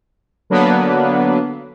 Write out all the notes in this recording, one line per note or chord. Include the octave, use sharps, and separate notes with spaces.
D3 F#3 A#3 B3 D4 B4